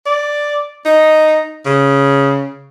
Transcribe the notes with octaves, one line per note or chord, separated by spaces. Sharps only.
D5
D#4
C#3